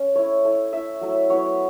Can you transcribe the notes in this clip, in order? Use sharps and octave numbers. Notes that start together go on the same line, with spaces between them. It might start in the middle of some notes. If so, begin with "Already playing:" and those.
Already playing: C#4
A3 E4 C#5
A3 E4
A3 E4 E5
F#3 A3 E4
F#3 B3 E4 C#5